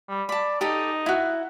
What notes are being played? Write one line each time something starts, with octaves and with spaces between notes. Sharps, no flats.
G3
D5 A5 B5
D#4 G4 A4 D#5
E4 F#4